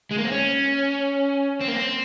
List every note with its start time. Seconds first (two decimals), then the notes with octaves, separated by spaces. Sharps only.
0.11 G#3
0.18 A#3
0.25 C4
0.31 C#4
1.61 C4
1.67 A#3
1.75 C4